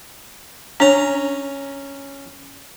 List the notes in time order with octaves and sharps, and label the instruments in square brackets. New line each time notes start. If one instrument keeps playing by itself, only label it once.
[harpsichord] C#4 A#5 [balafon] D4 C#5